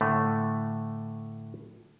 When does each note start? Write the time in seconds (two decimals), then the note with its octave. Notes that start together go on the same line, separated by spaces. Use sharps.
0.01 A2 D3 A3